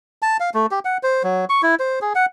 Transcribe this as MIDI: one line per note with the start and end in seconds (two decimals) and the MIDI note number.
0.22 0.37 81
0.40 0.50 77
0.54 0.66 57
0.71 0.80 67
0.85 0.98 78
1.03 1.23 72
1.24 1.45 54
1.50 1.62 85
1.63 1.75 64
1.79 1.99 72
2.02 2.13 68
2.15 2.26 78